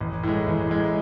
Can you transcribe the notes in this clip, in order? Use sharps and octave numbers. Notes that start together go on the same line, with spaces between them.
A1
A2 G#3
A1
A2 G#3